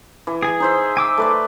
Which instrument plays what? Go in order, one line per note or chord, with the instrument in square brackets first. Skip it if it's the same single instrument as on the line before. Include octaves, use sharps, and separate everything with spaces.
[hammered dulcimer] E3
[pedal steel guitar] G#4 G#5
[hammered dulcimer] D#4 C5 E5
[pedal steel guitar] G#5 D6 E6
[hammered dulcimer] A3 B4 D5